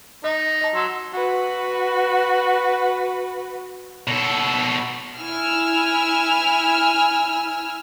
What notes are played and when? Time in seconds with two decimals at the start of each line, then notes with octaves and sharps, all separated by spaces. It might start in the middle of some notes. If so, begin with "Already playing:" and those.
0.24 D#4 D#5
0.61 D#5 A5
0.75 F#3 C6 E6
1.13 F#4 B4
4.07 B2 A4
5.20 E4 G#5 E6 F6